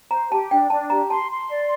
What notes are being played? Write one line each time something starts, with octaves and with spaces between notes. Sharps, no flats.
C5 A#5
G4 A5
D4 G5
D4 A5
G4 A#5
A5 C6
C6
D5